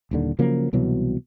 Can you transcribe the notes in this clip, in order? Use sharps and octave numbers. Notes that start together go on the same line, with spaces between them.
D#1 D#2 D3
C#3 F3 F#3 A#3
C2 B2 E3 F#3